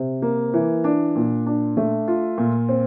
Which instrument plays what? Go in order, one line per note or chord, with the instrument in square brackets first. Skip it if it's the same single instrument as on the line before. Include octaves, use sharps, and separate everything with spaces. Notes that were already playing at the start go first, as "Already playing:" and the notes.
Already playing: [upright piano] C3
A#3
E3
D4
A#2
D4
A3
F4
A#2
C4